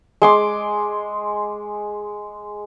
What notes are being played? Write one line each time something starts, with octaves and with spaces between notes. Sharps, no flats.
G#3 C6 D6